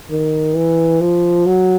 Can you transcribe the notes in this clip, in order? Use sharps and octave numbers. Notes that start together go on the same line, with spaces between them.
D#3
E3
F3
F#3